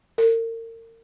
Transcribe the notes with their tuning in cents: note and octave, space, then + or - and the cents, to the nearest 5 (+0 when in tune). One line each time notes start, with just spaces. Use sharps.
A#4 -35